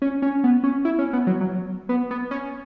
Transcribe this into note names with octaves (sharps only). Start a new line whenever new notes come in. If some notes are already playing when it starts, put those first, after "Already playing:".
C#4
C#4
B3
C#4
E4
C#4
B3
F#3
F#3
B3
B3
C#4